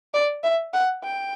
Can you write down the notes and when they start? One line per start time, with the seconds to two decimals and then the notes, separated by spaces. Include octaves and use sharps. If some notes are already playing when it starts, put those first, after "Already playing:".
0.14 D5
0.43 E5
0.73 F#5
1.03 G5